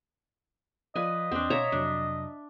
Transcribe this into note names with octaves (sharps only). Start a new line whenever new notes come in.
F3 B4 D5 D#5 F5 G#5
E2 C4 D4
B2 C#5 E5 F5 A#5 D6
F2 C3 F#3 D4